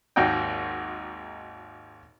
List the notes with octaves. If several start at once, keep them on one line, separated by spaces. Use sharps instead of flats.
G#1 D#2 D#4 F#4 D#5 G5